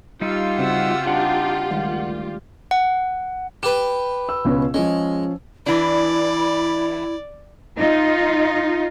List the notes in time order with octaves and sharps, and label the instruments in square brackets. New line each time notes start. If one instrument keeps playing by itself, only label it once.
[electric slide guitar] G3 D#4 [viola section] F4 G4 [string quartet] E6
[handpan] C#3 C4 F#4 [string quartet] E5 F#5 E6
[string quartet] G3 D4 D#4 [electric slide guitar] F#5
[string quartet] D2 [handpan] D#3 G3 G#3
[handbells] F#5
[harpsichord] G4 B4 [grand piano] E7
[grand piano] E6
C#2 B2 C#4
[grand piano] F3 C#4 [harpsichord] G#3
[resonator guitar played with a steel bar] E3 D4 [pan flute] E4 [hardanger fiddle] D5
[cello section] D#4 F4